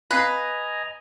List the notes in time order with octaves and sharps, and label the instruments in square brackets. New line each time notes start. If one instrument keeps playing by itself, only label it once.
[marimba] C4 F5 F#6 [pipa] B4 [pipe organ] D#5 G#5 A#5